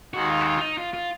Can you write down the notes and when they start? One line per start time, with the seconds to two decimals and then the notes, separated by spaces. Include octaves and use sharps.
0.13 D#2 D#3 G#3 D#4 F#4
0.30 F4
0.41 F#4
0.46 F4
0.57 F4
0.61 D#4
0.77 F4
0.93 F4